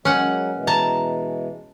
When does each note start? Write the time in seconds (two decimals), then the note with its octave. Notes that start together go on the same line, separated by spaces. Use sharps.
0.05 F#3 G#3 A#3 C#4 F#5
0.54 B2 E3 G#3
0.67 A5 A#5